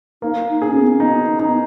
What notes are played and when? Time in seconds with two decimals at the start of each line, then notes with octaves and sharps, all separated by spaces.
0.22 A#3 D#4
0.62 D#4 G#4
0.70 C#4
0.79 B3
0.87 C#4
1.00 B3 D#4
1.39 D#4